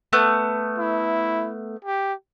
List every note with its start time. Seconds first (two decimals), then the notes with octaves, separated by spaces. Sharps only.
0.13 A3 B3 F#6
0.78 E4
1.85 G4